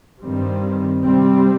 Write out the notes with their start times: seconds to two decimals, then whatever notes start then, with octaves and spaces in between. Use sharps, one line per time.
0.21 G2 D#3 G3 C4
1.02 C3 G3 C4